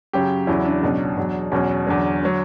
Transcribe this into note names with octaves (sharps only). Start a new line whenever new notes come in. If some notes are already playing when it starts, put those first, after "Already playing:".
F#2 C#3 F#3 G4
E2 C#3 F#3 E4
D4
C#2 B2 F#3
E2 B2 F#3
E2 B2 F#3 C#4
E2 D3 F#3
D3 F#3